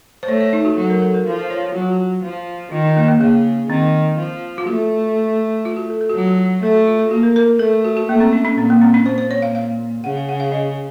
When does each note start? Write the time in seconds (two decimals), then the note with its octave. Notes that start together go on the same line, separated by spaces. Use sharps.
0.23 C5
0.28 A3 C#5
0.41 C#5
0.53 D#4
0.65 F#4
0.77 F#3 A4
0.90 A#4
1.02 A4
1.14 A#4
1.26 F3 A4
1.39 C5
1.50 C#5
1.62 C#5
1.75 F#3 F#4
1.82 F4
1.90 F#4
2.24 F3
2.72 D#3 F4
2.84 D#4
2.97 A#3
3.08 A#3
3.20 C#3 A#3
3.70 D#3 C4
4.18 F3
4.58 F4
4.67 A3 F#4
5.65 F4
5.77 F#4
5.90 A4
6.01 A4
6.10 F#4
6.14 F#3 F4
6.28 F#4
6.62 A3 A4
6.74 F#4
6.87 F4
6.99 A4
7.11 A#3 F#4
7.23 A#4
7.36 A#4
7.48 A#4
7.59 A3 A4
7.85 F#4
7.97 F#4
8.08 A3 A#3
8.20 C4
8.33 C#4
8.45 C#4
8.57 A#2 C4
8.70 A#3
8.81 C4
8.94 C#4
9.06 A#2 C5
9.18 C5
9.31 C#5
9.42 F5
9.55 F5
10.04 C#3 F#5
10.17 F5
10.29 F#5
10.40 F5
10.52 D#5